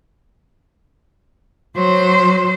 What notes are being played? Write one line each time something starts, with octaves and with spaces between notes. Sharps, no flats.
F#3 C5